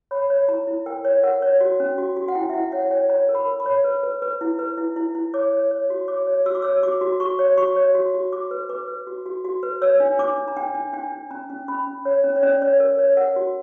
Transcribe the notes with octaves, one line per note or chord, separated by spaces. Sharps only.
C#5 B5
C#5
E4 A#5
E4
A#4 G5
C#5
A#4 F#5
C#5
F#4
C#4
F#4
F#4
F#5
E4 G5
E5
E4 F#5
C#5 F#5
F#5
C#5 G5
C#5 A#5
A#4
B5
A#4
B5
C#5
B4
B4
B4
E4
B4
E4
E4
E4
C#5 D6
C#5
C#5
F#4
C#5 D6
C#5
F#4 E6
D6
C#5 E6
F#4 D6
F#4
F#4 C#6
C#5
F#4 C#6
C#5
F#4
F#4
F#4 D6
B4
B4 D6
B4
F#4
F#4
F#4
B4
C#5 E6
D4
D4 D6
D4
A#5
D4 G5
D4
D4 G5
D4
C#4 A#5
C#4
C#4 B5
C#4
C#5
C#4
C#5
C#4 D5
C#5
A#4
C#5
A#4 F#5
F#4